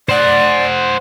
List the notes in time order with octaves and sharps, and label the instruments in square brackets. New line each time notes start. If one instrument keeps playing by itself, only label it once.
[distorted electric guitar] C5 F#5 [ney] D5